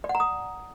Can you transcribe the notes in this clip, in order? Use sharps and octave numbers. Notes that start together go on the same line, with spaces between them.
D5
F#5
A#5
D#6